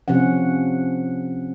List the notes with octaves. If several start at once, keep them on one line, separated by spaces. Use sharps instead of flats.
C3 F3 C4 C#4 F#5